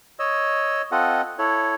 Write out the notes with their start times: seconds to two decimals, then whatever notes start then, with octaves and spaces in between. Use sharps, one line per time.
0.19 C#5 D#5 E6
0.92 C4 F4 A4 D#5 F#5
1.39 E4 A4 C#5